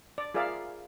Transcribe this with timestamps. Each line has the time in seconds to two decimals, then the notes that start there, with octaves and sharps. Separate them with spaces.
0.18 D5
0.34 F4 G#4 A#4 D5 E5 F5